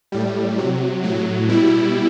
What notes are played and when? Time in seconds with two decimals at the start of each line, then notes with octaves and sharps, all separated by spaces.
0.12 A2 G3
0.58 C3 F#3
1.04 A2 F#3
1.49 B2 G3 E4